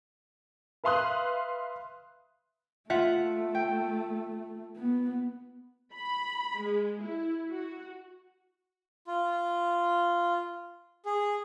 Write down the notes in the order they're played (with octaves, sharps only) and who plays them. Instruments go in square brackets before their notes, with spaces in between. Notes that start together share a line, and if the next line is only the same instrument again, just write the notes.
[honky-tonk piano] B4 E5 F5 C6 D#6 F#6
[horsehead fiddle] A3 [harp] F4 E5 F#5
[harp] G5
[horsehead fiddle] B3
[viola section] B5
G#3
E4
F#4
[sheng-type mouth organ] F4
G#4